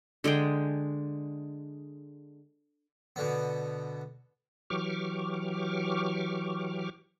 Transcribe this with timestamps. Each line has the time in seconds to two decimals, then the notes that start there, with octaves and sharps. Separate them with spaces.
0.24 D3 G#3 G#4 G5
3.16 B2 D3 B3
4.70 E3 F#3 G4 C#6 D6 F6